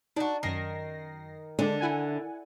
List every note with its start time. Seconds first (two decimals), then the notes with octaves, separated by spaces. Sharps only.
0.16 D4 D#4 F#4
0.43 F#2 D#3 A#6 C7
1.59 D3 G#3 D4
1.81 E4 F#5 G#5